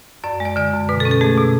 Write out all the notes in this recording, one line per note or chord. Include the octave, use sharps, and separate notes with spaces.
F#2 D5
G#3
D5
D3 D5
F#2
B2 B4
A4
C#4
A4
A3 G#4
B2